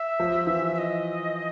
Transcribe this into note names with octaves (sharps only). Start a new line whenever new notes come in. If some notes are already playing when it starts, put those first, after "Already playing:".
Already playing: E5
F3
E3
E5
D#5